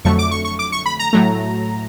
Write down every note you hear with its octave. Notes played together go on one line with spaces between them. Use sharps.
F2 D3 F#3 A3 C#6
D6
C#6
C#6
D6
C#6
B5
A#5
A2 F#3 A3